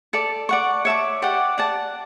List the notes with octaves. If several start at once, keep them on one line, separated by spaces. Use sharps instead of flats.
A4 D5 A5
D5 F#5 C#6
C#5 E5 A5 D6
G4 D5 F#5
D5 F#5 A5